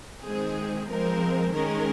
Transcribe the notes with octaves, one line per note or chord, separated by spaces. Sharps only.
D#3 G#3 C4 G#4
F3 G#3 C4 A#4
D#3 G#3 C#4 A#4